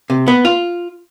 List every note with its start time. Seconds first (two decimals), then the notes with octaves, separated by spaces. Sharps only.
0.10 C3
0.28 B3
0.45 F4